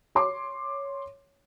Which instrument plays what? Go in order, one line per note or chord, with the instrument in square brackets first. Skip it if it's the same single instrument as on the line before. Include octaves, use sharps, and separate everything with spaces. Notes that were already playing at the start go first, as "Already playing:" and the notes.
[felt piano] C#5 C6 D6